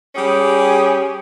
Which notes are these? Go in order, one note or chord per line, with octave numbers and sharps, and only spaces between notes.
G3 C#4 G4 G#4